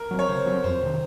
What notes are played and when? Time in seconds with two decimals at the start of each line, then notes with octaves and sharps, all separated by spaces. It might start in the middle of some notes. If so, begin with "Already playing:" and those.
Already playing: A#4
0.11 F#3 C4
0.19 C#5
0.29 C#3 C5
0.46 F#3 C4
0.64 F2 C5
0.82 C3 D#3